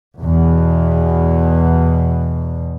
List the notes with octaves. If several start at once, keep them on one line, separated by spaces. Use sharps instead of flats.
E2 B2